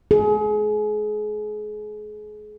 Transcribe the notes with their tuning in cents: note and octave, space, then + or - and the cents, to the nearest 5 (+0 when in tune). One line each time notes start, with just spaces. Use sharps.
G#4 +30